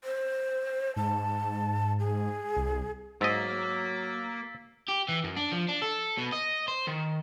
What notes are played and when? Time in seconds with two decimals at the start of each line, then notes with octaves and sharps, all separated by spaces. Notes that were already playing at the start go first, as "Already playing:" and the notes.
0.04 C5
0.96 G#2 A5
2.00 G#4
2.56 C2
3.21 G#2 F#3 A#3 D#5 E6 A6 B6
4.88 G4
5.09 E3
5.24 F#2
5.37 D4
5.52 F3
5.68 D4
5.82 A4
6.18 B2
6.32 D#5
6.68 C5
6.88 D#3